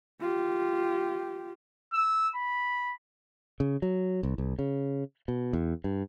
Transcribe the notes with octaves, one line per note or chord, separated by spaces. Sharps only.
F4 G4
E6
B5
C#3
F#3
C2
C2
C#3
B2
E2
G2